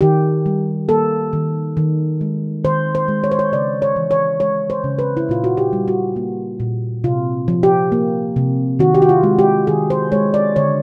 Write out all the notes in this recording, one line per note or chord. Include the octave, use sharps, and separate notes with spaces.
D#3 G4
G3
A#3 A4
D#3
D#3
G#3
D#3 C5
C5
G#3
C#5
C5
C#5
C#3 D5
C#5
E3
C#5
G#3 C#5
C5
C#3
B4
E4
A#2 F4
F#4
G4
G3
F#4
A#3
A#2
C3 F4
F3
G4
A#3
C3
D#3 F#4
G4
F#4
F4
G#3
G4
D#3 G#4
C5
G#3 C#5
D5
D3 C#5